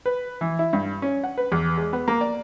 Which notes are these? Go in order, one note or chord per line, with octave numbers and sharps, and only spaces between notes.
B4
E3
E4
G2
C#4
F#5
B4
E2
G#3
B3
A#3
D5